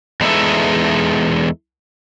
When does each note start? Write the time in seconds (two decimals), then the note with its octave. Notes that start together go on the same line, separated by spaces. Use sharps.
0.21 E2 G#3 D#4 A4 B4 E5